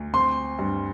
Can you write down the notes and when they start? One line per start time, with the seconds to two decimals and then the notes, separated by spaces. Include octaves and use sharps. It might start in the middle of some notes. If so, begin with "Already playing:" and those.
Already playing: D2
0.14 C4 C6
0.59 G2